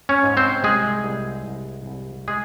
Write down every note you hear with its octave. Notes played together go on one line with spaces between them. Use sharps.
C#4 C#5
G#2
C4 C5
C2 G#3 G#4
C2
C2
C2
G#3 G#4